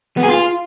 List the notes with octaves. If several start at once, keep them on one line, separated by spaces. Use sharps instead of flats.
B3
G#4
F4